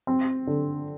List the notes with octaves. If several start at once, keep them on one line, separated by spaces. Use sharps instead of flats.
C4
D3